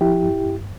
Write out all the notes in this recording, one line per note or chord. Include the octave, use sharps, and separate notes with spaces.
F3 E4 G4
G2
G2